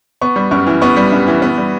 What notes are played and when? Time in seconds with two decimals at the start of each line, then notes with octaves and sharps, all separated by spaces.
0.21 B3 C#6
0.36 G3
0.51 F#2 C#6
0.67 E3
0.82 B3 C#6
0.97 G3
1.12 F#2
1.28 E3
1.42 B3
1.58 G3